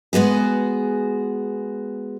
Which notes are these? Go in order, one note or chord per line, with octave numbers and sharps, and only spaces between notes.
G#3 B3 F#4 G#4